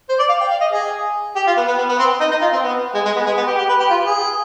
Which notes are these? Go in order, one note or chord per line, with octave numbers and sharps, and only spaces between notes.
C5
D5
F5
G5
F5
D#5
G#4
G4
F4
B3
B3
B3
B3
C4
D#4
D#4
F4
C4
B3
G#3
G#3
B3
G#3
B3
G4
G4
B4
G4
F4
G#4